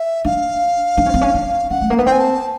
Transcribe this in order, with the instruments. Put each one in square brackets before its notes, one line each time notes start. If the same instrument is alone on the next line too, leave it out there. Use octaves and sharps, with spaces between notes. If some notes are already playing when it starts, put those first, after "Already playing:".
Already playing: [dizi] E5
[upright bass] D4 [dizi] F5
[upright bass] D4
C#4
C4
C#4
D4
[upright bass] C#4 [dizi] F#5
[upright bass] A3
A#3
[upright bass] B3 [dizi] F#5
[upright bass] C4 [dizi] G5
[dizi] G#5
A5